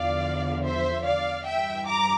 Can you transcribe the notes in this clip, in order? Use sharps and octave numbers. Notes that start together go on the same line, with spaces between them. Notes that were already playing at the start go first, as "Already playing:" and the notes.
Already playing: E2 D3 F3 D5 F5
C5 E5
D5 F5
G2 E3 E5 G5
A#5 D6